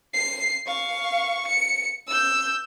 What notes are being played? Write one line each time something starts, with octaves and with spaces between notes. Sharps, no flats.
C7
F5 C#6
C#7
E6 G6